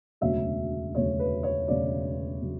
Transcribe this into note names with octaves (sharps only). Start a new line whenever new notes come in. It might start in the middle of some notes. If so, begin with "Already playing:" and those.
E1 D2 C#3 F#3 E5
E1 D2 C#3 F#3 C#5
B4
C#5
E1 D2 C#3 F#3 D5
C#3 F#3